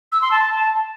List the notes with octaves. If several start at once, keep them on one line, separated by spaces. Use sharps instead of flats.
E6
C6
A5